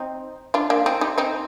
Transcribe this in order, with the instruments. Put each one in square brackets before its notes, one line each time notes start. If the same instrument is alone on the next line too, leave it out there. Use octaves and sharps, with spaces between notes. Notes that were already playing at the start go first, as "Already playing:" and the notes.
Already playing: [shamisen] C4 D#4
D4 F4
A#3 D4
C4 D#4
D#4 G4
C4 D#4